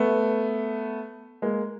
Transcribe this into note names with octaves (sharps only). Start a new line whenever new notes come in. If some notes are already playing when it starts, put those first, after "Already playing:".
Already playing: A3 B3
G#3 A#3